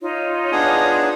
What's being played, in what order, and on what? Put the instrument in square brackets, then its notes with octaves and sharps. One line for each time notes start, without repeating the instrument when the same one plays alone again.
[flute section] D#4 F4 C#5
[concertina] B3 D4 G#4